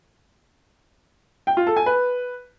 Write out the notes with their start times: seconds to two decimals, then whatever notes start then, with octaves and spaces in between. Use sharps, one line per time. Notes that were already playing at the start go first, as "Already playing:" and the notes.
1.47 G5
1.57 F4
1.67 A4
1.77 G#5
1.86 B4